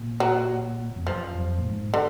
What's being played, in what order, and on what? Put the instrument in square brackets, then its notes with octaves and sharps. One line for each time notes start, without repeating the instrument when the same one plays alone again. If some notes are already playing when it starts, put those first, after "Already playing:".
Already playing: [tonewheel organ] A#2
[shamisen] F#3
[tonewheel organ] F2
[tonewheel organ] F#2 [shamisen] F3
[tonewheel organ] F2
A#2
G#2
[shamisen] D3